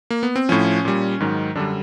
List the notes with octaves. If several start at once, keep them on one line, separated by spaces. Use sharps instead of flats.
A#3
B3
C4
A2 F3 C#4
A#2 G3
G#2 D#3 F#3
F#2 D3 G3 D4